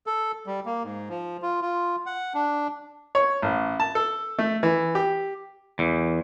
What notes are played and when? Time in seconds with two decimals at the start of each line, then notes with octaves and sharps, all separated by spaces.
0.07 A4
0.47 G3
0.66 A#3
0.84 G#2
1.09 F3
1.42 F4
1.62 F4
2.06 F#5
2.34 D4
3.15 C#5
3.42 A1
3.80 A5
3.95 A4
4.39 A3
4.63 E3
4.95 G4
5.79 E2